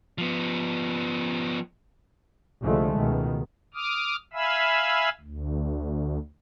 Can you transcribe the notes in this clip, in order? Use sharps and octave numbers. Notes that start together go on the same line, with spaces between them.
F3 B3
C2 D3 F3 G#3 A3
C#2 B2 D#3
D6 D#6 F6
E5 F5 G#5 B5 E6
D2